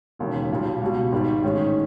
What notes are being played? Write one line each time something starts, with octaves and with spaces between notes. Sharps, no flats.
E1 D#2 C#3
B1 A#2 G3
C#2 B2 G3
G#1 G#2 D#3 G3
A1 G#2 D#3 G#3 C#4